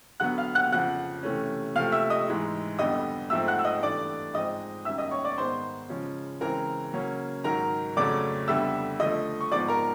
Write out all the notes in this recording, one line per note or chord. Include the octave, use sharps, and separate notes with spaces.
D3 F#3 B3 F#5 F#6
F5 F6
F#5 F#6
F2 C#3 F3 F#5 F#6
C3 E3 A3 C#4
C3 F3 A3 F5 F6
E5 E6
D#5 D#6
G#2 E3 G#3
F2 D3 G3 B3 D#5 D#6
G#2 F3 A3 C4 E5 E6
F#5 F#6
E6
D#5 D#6
G2 E3 A3 D5 D6
G#2 F3 G#3 C4 D#5 D#6
F#2 D#3 G3 E5 E6
D#5 D#6
C#5 C#6
D5 D6
G#2 D#3 G#3 B3 C5 C6
C#3 F3 G#3 C#4
C#3 E3 G#3 C4 A#4 A#5
C#3 F#3 A#3 C#4
G#2 D#3 F#3 A#4 A#5
F2 C#3 F#3 A3 C#4 D5 D6
F2 D3 G3 B3 E5 E6
D3 F3 A3 D#5 D#6
C#6
G#2 F3 G#3 B3 D5 D6
A#4 A#5